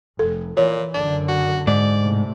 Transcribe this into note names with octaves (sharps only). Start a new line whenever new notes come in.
F1 A4
A#2 E3 C#5
F#1 F#2 D3 D4
F#4
G#2 D5
A2 C3 A3